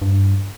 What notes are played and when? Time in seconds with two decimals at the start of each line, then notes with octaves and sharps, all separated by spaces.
0.02 G2